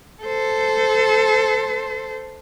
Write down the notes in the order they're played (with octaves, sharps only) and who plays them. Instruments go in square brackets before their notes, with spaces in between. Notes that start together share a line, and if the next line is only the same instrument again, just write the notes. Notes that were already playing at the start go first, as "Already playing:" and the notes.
[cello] A4 C5